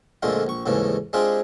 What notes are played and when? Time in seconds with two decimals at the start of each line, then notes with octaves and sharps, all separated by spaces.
0.23 F2 A#2 D3 G#3 A3 F4
0.47 A#1 C#6
0.66 D#2 G#2 C#3 E3 A3
1.13 G#3 C4 D4 F4 G4 G#4